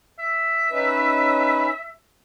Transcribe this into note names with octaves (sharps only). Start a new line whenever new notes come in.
E5
C#4 D#4 B4